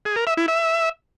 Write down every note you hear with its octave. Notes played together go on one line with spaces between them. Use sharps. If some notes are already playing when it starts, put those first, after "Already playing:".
G#4
A#4
E5
E4
E5